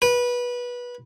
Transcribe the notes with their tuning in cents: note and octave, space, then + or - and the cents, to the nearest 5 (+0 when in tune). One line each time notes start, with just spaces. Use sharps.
B4 -20